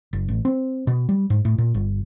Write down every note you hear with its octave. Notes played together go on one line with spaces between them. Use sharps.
F#1
A1
C4
B2
G3
G#2
A2
A#2
G1